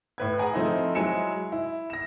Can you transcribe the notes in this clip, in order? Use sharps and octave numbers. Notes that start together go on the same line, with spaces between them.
A2 B4 G#6
G#4 F#5 G#5 A#5
F3 A3 C4 D#4 E4
F#3 G#3 E4 G#5 C#7 E7
E4
A#6 E7